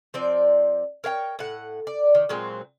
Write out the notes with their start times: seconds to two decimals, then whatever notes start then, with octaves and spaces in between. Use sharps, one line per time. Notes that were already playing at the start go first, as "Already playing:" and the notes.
0.14 F3 C4 D5
1.04 A#4 C#5 F5 G5
1.39 A2 F#5
1.87 D5
2.15 D#3
2.29 A#2 F#3 G#3 C4